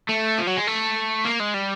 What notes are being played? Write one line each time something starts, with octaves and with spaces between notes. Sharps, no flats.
A3
F3
F#3
G#3
A3
A#3
G#3
G3